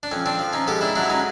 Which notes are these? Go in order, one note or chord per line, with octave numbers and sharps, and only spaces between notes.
D4
F2 C#4
C4 D4
F3
C#4 D#4
G#2 G4 A4
D4 E4
F#3 D4 E4
C#4 D#4